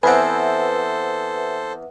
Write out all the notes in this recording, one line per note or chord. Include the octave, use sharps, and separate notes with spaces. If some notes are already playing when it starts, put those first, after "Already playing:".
E2 C4 A4 B4 C5 E5 F#5 G#5